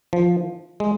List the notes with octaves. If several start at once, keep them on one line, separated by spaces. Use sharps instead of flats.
F3
G#3